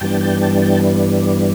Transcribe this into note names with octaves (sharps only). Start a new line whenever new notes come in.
G2 E3 G3 B3 D4 G5 A5
G5 A5
G5 A5
G5 A5